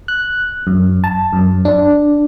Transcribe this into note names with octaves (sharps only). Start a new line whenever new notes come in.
F#6
F#2
A5
F#2
D4